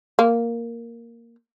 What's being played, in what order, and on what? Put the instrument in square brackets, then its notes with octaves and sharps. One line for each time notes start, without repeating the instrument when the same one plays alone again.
[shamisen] A#3